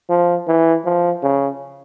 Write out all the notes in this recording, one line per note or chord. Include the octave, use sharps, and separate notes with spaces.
F3
E3
F3
C#3